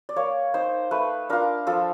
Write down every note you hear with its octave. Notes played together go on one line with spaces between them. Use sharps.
D5
A#3 C#5
D#4 C5
A3 B4
D4 F4 A#4
F3 A4